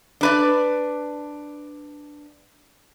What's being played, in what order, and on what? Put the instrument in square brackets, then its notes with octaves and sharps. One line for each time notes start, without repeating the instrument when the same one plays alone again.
[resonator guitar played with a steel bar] D4 B4 D5